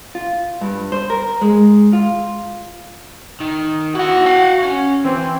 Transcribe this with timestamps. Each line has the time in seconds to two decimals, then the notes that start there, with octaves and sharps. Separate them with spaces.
0.15 F4
0.61 G2
0.92 C5
1.10 A#4
1.41 G#3
1.93 F4
3.40 D#3
3.95 E4 F#4 F#5
4.26 F5 F#5
4.63 C#4
5.04 E3 C4